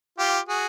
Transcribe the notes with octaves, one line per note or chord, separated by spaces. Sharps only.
F4 G4
F#4 G#4